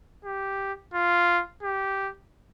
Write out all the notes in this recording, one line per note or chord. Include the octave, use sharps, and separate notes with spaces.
G4
F4
G4